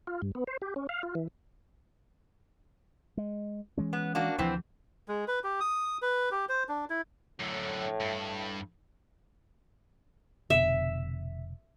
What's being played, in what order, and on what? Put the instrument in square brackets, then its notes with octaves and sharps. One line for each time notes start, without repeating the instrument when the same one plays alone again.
[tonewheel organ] F4
G2
B3
C5
G4
C#4
F5
F4
E3
[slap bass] G#3
E3 G#3 C#4
[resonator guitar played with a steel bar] B3
A#3 D4 F#4
[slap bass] D2 F3 [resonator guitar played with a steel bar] C3 E3 C4
[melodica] G#3
B4
G4
D#6
B4
G4
C5
D4
E4
[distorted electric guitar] F#2 D3 [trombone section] A2
[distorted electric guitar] G2
[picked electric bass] F1 B2 D3 [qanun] E5